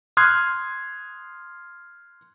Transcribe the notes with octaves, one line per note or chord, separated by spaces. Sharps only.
C6 D#6 F6 F#6 G#6 C7